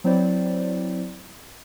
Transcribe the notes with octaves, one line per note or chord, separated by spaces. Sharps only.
F#3 C4 E4 C5 D5